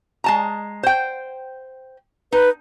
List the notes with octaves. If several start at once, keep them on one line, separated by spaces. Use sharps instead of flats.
G#3 A5 A#5
C5 G5
D#4 B4